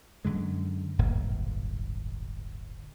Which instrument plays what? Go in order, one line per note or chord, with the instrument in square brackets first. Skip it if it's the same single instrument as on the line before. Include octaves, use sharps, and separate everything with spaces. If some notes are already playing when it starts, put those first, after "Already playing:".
[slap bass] F#2 D3 G#3
D1 G1 A#2